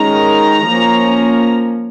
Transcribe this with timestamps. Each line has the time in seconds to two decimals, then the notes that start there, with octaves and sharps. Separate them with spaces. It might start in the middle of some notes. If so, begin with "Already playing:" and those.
Already playing: D#3 G#3 C#4 A#5
0.68 F3 A#3 C#4